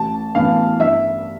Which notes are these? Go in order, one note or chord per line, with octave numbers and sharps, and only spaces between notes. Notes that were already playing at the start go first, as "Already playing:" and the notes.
Already playing: A1 A5
A2 E3 B3 F5
G2 E5